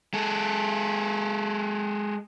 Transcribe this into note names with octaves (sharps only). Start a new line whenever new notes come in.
G#3 A4